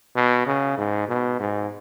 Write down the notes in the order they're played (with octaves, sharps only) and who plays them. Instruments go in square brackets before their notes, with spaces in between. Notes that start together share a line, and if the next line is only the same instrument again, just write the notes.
[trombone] B2
C#3
G#2
B2
G#2